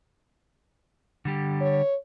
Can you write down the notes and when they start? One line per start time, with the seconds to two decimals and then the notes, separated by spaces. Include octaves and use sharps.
1.25 D3 G3 G4
1.61 C#5